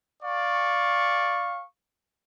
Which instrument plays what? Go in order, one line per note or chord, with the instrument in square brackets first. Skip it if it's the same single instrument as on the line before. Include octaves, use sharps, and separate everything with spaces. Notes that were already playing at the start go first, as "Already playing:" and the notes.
[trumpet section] D5 F5 C#6